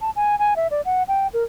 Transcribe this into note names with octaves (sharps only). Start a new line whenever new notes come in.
A5
G#5
G#5
E5
D5
F#5
G5
A#4